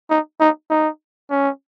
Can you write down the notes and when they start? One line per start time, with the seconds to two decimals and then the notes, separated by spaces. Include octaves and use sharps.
0.10 D#4
0.40 D#4
0.70 D#4
1.31 C#4